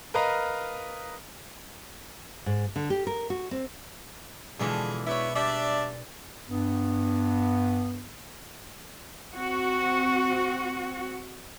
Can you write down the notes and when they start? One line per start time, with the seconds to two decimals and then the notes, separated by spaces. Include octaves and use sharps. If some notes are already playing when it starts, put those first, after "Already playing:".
0.14 A#4 B4 D#5 F5 A#5
2.46 G#2
2.76 D3
2.90 G4
3.07 A#4
3.30 F#4
3.51 C4
4.59 B2 D3 E3 F3 G#3 D4 G#4
5.06 B3 E4 C#5 E5 D6
5.35 G3 D4 D5 E5
6.48 G2 B3
9.33 C4 F#4